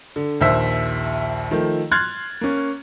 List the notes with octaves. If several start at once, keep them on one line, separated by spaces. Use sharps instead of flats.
D3
A#1 D#2 C5 E5 E6 B6
D#3 F3 A3
C6 F6 F#6 G#6 A6
A#3 C#4